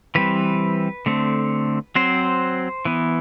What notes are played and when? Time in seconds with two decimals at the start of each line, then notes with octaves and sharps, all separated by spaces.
0.15 E3 G3 C4 B4
1.06 D3 A3 C4
1.95 F#3 C4 C5
2.85 E3 B3